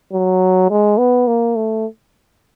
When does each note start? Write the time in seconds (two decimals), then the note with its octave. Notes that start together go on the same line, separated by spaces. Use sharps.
0.13 F#3
0.70 G#3
0.98 B3
1.27 A#3
1.56 A3